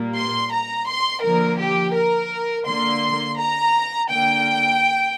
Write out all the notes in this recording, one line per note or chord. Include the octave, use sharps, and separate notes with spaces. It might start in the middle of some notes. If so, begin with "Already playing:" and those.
Already playing: A#2 G3 A#3
C6
A#5
C6
D3 F3 A#3 A#4
G4
A#4
D3 A#3 C6
A#5
D3 A#3 G5